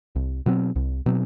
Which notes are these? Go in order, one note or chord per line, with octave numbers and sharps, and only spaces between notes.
C2
B2 F#3 C4
C2
B2 F#3 C4